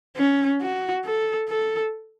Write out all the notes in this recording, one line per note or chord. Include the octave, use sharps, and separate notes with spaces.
C#4
F#4
A4
A4